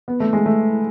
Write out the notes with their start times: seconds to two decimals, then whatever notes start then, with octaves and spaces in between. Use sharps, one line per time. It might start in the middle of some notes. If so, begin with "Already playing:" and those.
0.08 B3
0.20 A3
0.33 G#3
0.46 A3